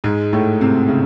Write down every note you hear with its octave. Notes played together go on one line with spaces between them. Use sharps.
G#2 G#3
A2 A3
C3 C4
C#3